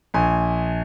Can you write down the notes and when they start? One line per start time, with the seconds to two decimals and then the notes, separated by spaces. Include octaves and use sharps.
0.14 A#1 G#5